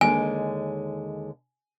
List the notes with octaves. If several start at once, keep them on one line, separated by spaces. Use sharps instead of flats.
D#2 D3 G#3 G#5